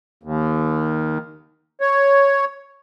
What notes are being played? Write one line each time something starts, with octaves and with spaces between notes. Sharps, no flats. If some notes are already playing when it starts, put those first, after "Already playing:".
D#2
C#5